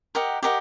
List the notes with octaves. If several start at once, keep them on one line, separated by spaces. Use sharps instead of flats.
G4 A#4 D#5 F#5
G4 A#4 D#5 F#5